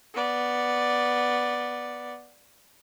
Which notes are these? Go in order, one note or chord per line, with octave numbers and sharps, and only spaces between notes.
B3 D5